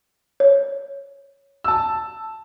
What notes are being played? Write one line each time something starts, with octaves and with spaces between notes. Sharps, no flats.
C#5
A5 E6